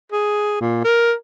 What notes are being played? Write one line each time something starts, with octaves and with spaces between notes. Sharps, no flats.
G#4
A#2
A#4